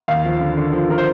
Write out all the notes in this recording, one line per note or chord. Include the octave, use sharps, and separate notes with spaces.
D#2 F5
F3
D3
D3
F3
F3 A#4
C5